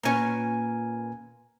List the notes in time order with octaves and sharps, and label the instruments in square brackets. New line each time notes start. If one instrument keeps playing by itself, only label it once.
[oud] A#2 C#4 [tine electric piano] B4 G#5 A#5